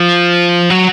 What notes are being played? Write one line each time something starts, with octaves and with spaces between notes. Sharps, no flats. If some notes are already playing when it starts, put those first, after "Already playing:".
Already playing: F3
F#3